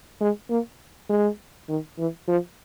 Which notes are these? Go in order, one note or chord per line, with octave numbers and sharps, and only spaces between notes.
G#3
A#3
G#3
D#3
E3
F3